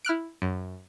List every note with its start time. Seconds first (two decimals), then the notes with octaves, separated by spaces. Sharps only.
0.05 E4 F6 F#6 D7
0.42 F#2